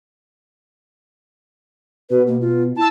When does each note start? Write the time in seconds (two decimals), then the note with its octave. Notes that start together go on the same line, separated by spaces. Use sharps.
2.10 B2 B4
2.27 A#3
2.41 F4
2.76 E4 A5 E6